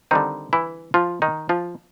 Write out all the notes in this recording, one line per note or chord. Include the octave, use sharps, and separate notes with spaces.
D3 D#3 G3 C4 D#4
E3 E4
F3 F4
D#3 D#4
F3 F4